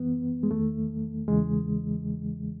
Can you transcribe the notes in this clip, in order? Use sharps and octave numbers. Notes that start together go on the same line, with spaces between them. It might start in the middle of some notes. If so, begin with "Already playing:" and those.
Already playing: F#2 E3 B3
G#3
E2 D#3 A3
E2 C#3 E3 G#3